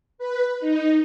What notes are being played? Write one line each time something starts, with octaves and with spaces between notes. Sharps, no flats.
B4
D#4